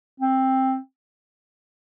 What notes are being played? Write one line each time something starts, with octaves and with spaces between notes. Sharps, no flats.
C4